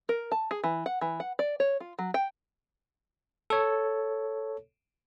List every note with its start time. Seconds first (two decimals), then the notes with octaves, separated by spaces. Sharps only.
0.09 A#4
0.32 A5
0.51 G#4
0.64 E3
0.86 F#5
1.01 E3
1.20 F#5
1.39 D5
1.60 C#5
1.80 F4
1.99 F#3
2.14 G5
3.50 A4 C#5